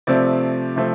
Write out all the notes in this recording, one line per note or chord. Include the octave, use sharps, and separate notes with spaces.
C3 F3 A3 C4 D5
C3 F3 A3 C4